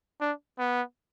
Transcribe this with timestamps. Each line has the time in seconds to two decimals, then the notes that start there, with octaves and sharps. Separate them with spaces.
0.21 D4
0.59 B3